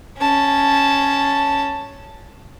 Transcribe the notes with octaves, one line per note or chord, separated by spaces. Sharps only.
C#4 A5